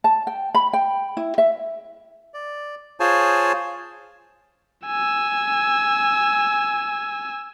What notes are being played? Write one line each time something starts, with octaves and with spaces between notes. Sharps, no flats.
A5
G5
B5
G5
E4
E5
D5
F4 G#4 C5 C#5 G#5 A5
G#5 E6